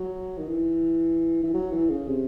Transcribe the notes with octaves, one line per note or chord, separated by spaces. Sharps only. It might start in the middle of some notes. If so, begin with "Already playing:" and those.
Already playing: F#3
D#3
E3
E3
F#3
E3
C#3
C3